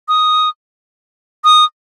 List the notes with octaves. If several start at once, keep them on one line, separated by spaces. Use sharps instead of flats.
D#6
D#6